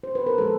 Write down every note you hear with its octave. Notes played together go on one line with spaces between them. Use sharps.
C5
B4
A#4
A#2 F3 G#3 A4